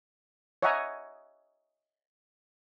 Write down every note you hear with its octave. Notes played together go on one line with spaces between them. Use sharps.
C#5 D#5 E5 F#5 G#5 A#5